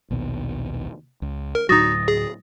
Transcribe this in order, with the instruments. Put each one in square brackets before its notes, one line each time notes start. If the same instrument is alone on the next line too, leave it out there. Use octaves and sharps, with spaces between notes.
[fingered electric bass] A#1 D#2 B2
C#2
[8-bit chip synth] A#4
[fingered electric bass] D2 A2 F#3 [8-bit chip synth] D#4 F#4 [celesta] D#6 A6 A#6
[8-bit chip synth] G#4